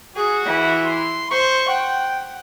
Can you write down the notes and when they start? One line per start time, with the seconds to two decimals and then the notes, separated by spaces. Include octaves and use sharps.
0.16 F#4 G#4
0.45 E3
0.86 C6
1.31 C5 C#6
1.69 F#5 G5